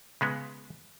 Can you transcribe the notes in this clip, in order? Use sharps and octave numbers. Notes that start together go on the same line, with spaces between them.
C#3 G#3 B3